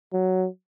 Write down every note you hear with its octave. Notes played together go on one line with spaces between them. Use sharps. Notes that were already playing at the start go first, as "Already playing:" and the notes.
F#3